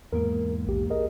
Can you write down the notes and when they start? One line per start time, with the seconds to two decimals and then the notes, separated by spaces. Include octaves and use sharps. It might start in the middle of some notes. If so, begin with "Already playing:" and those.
0.13 E2 G#2 A#3 A#4
0.67 A#1 G4
0.90 G#4 A#4 D#5